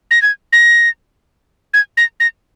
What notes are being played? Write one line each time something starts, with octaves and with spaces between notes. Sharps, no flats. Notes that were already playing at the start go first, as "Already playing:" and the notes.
A#6
G#6
A#6
G#6
A#6
A#6